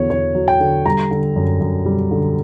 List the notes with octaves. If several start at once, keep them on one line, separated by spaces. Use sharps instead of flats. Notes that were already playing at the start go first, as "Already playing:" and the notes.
Already playing: E2 D3 F#3 C#5
E2 C#5
F#3
G5
D3
G3 A#5
D3
F#2
F#2
G3
D3